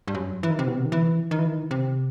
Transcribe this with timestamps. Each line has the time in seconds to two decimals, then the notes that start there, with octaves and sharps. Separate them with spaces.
0.08 G2
0.15 F#2
0.43 E3
0.51 D#3
0.59 C3
0.67 B2
0.77 C3
0.85 D#3
0.92 E3
1.31 D#3
1.39 E3
1.46 D#3
1.71 C3